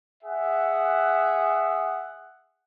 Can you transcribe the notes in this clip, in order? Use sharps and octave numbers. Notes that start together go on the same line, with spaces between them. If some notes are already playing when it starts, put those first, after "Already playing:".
G#4 E5 F#5